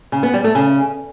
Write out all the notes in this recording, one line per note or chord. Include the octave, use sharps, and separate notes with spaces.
C#3
B3
G3
A3
C#3